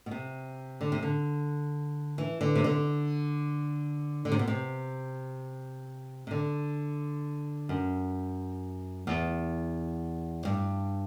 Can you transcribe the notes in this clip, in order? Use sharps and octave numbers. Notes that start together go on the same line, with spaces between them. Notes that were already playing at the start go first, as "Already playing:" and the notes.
B2
C3
D3
C3
D3
E3
D3
C3
D3
D3
C3
B2
C3
C3
D3
F#2
E2
G2